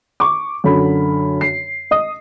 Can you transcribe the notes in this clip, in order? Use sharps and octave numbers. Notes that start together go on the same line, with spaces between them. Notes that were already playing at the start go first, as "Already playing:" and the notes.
C#6 D6
F#2 D3 B5
C7
D#5 D#6